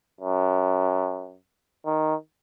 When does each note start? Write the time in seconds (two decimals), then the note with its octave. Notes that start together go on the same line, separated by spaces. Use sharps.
0.20 F#2
1.86 D#3